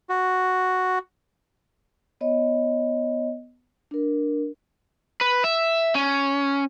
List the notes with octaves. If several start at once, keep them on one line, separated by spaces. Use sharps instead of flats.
F#4
B3 C#5 D#5
D4 A#4
B4
E5
C#4